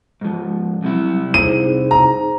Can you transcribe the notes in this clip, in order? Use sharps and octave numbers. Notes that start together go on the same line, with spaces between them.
G#2 F3
C2 C3 F#3 E4
D#4 G#4 C5 D#7
A#5